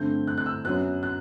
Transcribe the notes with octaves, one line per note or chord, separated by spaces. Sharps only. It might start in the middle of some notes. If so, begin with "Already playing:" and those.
Already playing: G2 D3 A3 C4 G6
F#6
F#6
E6
F#2 F#3 B3 F#6
F#6